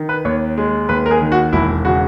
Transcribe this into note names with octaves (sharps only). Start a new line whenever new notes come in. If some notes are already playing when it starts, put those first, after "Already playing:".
Already playing: D#3
B4
D#2 C#5
G#3
D#2 B4
A#4
G#4
D#3
F#4
E1 E4
C#3 F#4